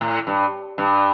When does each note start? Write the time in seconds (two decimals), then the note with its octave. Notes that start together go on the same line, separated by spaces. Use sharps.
0.01 A2
0.27 G2
0.78 G2